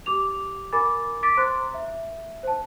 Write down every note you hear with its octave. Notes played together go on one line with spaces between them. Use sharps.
G4 D6 F7
A#4 G#5 B5 D6 A6
D6 A6 B6 D7
C5 A#5 C6 D6 F#6
E5
C5 A5